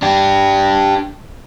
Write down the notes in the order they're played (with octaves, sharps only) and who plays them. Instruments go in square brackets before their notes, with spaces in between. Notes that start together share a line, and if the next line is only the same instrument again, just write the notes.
[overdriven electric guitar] D4 G4